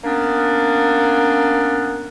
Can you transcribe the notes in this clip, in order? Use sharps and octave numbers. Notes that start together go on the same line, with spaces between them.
A#3 B3 C#4 D4